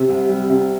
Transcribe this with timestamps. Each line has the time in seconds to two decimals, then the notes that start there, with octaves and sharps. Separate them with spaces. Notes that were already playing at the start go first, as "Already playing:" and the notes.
Already playing: C3
0.09 C2
0.29 G3
0.50 C3